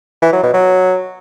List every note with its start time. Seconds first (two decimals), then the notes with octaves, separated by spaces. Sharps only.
0.22 E3
0.33 F#3
0.43 B2
0.54 F#3